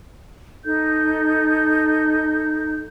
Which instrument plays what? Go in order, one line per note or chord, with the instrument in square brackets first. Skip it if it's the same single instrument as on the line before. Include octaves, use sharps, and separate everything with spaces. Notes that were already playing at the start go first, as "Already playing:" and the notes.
[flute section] D#4 A4 G6